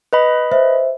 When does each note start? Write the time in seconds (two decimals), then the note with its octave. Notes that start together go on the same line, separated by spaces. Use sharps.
0.13 B4 D#5 B5
0.51 C5 E5